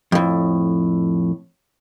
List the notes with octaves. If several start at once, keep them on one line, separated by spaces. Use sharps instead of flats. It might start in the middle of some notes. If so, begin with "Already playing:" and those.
F2 A2